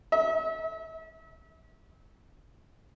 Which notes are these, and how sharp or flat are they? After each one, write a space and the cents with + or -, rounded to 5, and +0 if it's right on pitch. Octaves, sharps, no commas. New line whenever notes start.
E5 -35